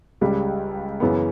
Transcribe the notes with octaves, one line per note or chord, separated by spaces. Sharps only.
C#2 C#3 G3
F#2 C#3 E3 B3